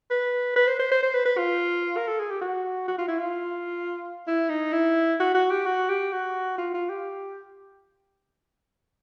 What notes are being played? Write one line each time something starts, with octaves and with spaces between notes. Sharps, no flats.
B4
B4
C5
C5
C5
C5
B4
B4
F4
A#4
A4
G#4
G4
F#4
F#4
F4
E4
F4
E4
D#4
E4
F#4
F#4
G4
F#4
G4
F#4
F4
F4
G4